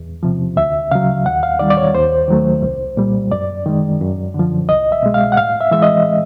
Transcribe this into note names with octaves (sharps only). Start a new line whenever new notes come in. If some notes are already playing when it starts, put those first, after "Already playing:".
Already playing: E2
C3 F3
D2 E5
C#3 F#3 F5
D#2 F#5
F5
D#3 G3 D5
D5
C#5
D#2 C5
D#3 F#3 A3
C2
A#2 G3
F#2 D5
D#3 G#3
F#2
D3
F3
C2 D#5
E5
B2 G#3
F5
F#5
A2 F5
E5
E3 G#3 E5
D#5